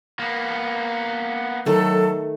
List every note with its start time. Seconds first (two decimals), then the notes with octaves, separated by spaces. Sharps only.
0.19 A#3 B3
1.66 D#3 F#3 A3 A4